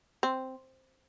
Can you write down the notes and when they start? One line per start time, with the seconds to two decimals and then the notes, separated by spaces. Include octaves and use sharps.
0.23 C4